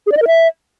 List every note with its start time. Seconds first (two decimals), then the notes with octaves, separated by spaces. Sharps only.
0.07 G#4
0.12 D5
0.17 D#5
0.22 A#4
0.27 E5